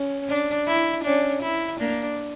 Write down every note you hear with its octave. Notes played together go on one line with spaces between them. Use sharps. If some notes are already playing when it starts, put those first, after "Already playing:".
Already playing: C#4
D4
E4
C#4 D4
E4
A#3 D4